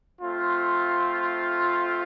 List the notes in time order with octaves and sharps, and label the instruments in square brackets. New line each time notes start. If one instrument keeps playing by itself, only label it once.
[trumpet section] A3 C4 F4